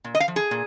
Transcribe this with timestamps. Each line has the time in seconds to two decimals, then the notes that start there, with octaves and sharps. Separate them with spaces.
0.04 A#2
0.15 D#5
0.20 F5
0.28 F3
0.36 G#4
0.51 A#2